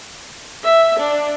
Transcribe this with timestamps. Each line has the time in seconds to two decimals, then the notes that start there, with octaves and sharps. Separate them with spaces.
0.64 E5
0.97 D4